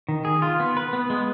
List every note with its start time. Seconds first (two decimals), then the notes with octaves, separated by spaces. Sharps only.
0.08 D#3
0.25 G#4
0.42 F4
0.60 B3
0.77 B4
0.93 B3
1.10 G#3